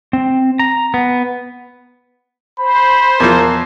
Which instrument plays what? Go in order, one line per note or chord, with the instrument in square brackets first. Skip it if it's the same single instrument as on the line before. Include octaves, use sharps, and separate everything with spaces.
[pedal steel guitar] C4
A#5
B3
[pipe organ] C5 [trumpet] B5
[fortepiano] E2 E3 F3 [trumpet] A#4